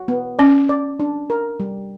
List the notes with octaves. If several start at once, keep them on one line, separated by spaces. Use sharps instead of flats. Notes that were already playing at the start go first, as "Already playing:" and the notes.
Already playing: F#4
B3
C#4 D5
D5
D4
A#4
G3